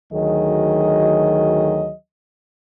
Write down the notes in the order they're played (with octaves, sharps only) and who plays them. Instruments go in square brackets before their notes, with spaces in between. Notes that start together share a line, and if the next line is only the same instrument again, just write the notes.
[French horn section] D2 D#3 F#3 G#4 D#5